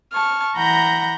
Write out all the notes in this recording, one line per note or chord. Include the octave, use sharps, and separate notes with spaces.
A5 C#6 F6
E3 F#5 A#5 B5 G6 A#6